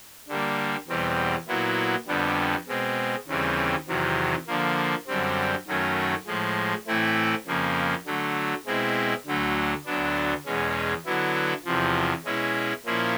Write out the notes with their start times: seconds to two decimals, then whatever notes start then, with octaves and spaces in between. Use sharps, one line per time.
0.28 D3 G3 A#3
0.88 E2 B2 G3 C4
1.47 A#2 F#3 B3 E4
2.07 F2 D3 G3 B3
2.67 B2 G#3 C4
3.27 D#2 C#3 E3 G3 C4
3.87 E2 C3 D#3 F#3
4.47 D3 F3 A#3
5.07 F#2 D3 G3 C4
5.67 F#2 D#3 F#3 A3 C#4
6.27 A2 F3 G#3
6.87 A2 E3 A3 C4 E4
7.47 F2 C#3 F3 A#3
8.06 D3 F#3 A3
8.66 B2 G#3 C4 E4
9.26 D2 D3 F#3 A3
9.86 D2 D3 F#3 B3 D4
10.46 E2 B2 G#3 C#4
11.05 D3 F#3 B3 E4
11.65 E2 C3 F3
12.25 B2 G#3 C#4 E4
12.86 A#2 F3 A#3 C#4 E4